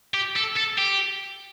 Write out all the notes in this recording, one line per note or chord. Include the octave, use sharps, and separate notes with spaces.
G4
A4
A4
G4